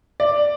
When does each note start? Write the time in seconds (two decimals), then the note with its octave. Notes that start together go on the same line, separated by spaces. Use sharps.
0.20 D5